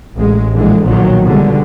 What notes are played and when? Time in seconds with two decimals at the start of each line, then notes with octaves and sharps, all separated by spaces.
0.16 A1 G#3
0.54 A#1 D3 E3 G#3
0.84 B1 A#2 D#3 F3 F#3
1.25 B2 D3 G3 G#3